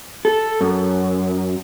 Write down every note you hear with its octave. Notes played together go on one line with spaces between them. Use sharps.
A4
F#2